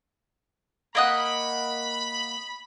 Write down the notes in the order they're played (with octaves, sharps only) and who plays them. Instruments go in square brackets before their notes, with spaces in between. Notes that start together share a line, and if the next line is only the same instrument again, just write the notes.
[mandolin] A#3 D#5 F#5 [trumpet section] B5